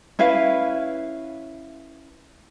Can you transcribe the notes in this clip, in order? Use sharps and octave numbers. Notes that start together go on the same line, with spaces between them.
C#4 E4 B4 F5